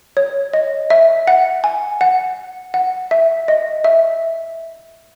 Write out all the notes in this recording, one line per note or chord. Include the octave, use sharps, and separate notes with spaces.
C#5
D#5
E5
F#5
G#5
F#5
F#5
E5
D#5
E5